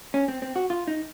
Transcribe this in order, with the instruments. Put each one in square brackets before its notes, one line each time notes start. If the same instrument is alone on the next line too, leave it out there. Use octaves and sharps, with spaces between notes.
[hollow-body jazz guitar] C#4
C4
C4
F#4
F4
D#4